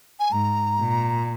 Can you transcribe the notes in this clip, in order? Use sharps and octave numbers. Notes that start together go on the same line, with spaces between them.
G#5
G#2 A#5
A#2